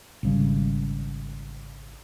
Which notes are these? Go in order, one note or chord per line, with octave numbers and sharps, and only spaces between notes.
G#1 C#3 G3